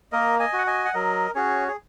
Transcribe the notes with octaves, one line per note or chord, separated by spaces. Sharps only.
A#3 A#4 D#5
D#5 G#5
F#4
F#5
D#5 G#5
F#5
F#3 A#4 D#5
C#4 F#4 G#4 C#5
G#4